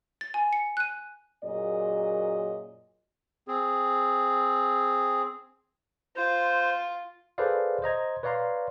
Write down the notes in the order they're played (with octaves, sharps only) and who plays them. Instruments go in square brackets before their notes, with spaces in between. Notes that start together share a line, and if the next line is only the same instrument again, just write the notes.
[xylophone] A6
G#5
C#7
F#6 D#7
[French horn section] F#2 A#2 F#3 G#4 D#5
[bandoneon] C4 G#4
[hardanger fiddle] F4 [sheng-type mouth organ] C5
[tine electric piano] G#4 A4 B4 C5 D5 F5
C5 D#5 A#5 G#6
B4 C#5 D5 F5 A#5 C6